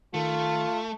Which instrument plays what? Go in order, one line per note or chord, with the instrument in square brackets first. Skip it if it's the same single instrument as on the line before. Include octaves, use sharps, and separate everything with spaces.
[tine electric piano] D#3 C#7 [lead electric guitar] A3 [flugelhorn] F4 [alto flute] A5